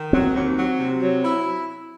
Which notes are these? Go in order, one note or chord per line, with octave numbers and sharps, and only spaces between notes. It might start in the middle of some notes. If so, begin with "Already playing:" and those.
Already playing: D#3
F#3 C4
D#2
F#3
C3
F#3
E4